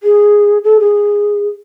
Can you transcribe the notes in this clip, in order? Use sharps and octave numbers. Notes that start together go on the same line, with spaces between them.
G#4
A4
G#4